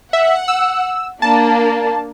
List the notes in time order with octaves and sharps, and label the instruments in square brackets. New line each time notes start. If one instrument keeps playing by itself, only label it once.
[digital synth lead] E5 [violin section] F#5
[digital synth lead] E6
[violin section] A#3 D4 [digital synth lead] A5